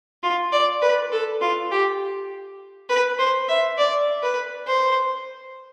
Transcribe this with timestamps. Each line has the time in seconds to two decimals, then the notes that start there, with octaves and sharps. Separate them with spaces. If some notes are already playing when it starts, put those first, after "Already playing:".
0.23 F4
0.52 D5
0.82 B4
1.12 A4
1.41 F4
1.71 G4
2.89 B4
3.19 C5
3.49 E5
3.78 D5
4.22 B4
4.67 C5